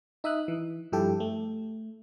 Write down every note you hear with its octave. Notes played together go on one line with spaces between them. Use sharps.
D#4 E5 D#6 F#6
E3
G2 F3 E4 G4 A4 G5
A3